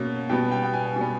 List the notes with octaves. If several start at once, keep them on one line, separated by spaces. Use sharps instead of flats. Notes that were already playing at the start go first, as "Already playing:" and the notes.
Already playing: B2 A#3 C#4
B2 G3 B3 G5
G5
G5
G#5
B2 G3 B3 G#5